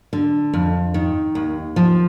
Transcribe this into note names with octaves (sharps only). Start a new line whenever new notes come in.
D3
F2
D#3
D#2
F3